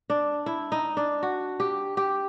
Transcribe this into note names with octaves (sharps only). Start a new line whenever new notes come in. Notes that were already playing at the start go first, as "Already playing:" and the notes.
D4
E4
D#4
D4
F#4
G4
G4